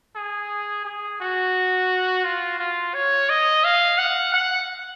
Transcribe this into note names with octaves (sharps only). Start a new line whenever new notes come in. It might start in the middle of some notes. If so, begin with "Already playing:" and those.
G#4
G#4
F#4
F4
F4
C#5
D#5
F5
F#5
F#5